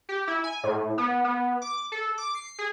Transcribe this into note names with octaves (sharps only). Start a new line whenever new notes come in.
G4
E4
G#5
A2
B3
B3
D6
A4
D6
C7
G#4